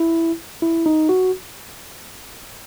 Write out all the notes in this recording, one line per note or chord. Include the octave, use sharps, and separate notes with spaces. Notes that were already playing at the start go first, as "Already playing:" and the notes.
Already playing: E4
E4
D#4
F#4